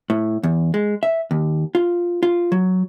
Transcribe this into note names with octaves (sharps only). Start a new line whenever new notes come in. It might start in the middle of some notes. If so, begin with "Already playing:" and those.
A2
E2
G#3
E5
D#2
F4
F4
F#3